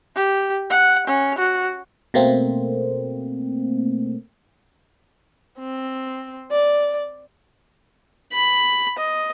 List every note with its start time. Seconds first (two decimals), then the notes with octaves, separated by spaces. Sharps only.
0.16 G4
0.70 F#5
1.07 C#4
1.38 F#4
2.14 B2 A3 A#3 C4
5.60 C4
6.51 D5
8.33 B5
8.98 D#5